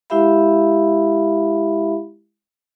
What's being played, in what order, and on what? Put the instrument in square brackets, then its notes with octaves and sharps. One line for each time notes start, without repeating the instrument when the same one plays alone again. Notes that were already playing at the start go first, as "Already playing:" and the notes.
[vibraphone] G#3 E4 G4 E5 F5 B5